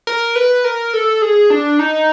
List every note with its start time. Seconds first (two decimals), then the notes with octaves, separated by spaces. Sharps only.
0.07 A#4
0.36 B4
0.64 A#4
0.94 A4
1.22 G#4
1.50 D4
1.79 D#4